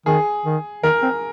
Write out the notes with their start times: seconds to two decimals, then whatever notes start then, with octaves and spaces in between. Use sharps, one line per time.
0.06 D#3 G#4
0.46 D#3
0.83 D#3 A#4
1.03 C4